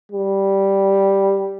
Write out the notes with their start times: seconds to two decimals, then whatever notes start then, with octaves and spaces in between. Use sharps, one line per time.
0.12 G3